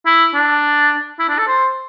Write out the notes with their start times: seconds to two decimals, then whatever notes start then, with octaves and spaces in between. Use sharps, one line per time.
0.06 E4
0.34 D4
1.19 E4
1.29 D4
1.39 A4
1.48 C5